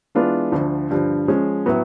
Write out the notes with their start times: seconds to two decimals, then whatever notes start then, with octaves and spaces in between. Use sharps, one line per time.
0.15 E3 G#3 B3 D4 F4
0.52 D2 D3 F3
0.90 G2 D3 F3
1.28 F3 G#3 C#4
1.66 A2 F#3 B3